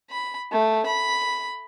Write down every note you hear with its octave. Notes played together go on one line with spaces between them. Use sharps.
B5
A3
B5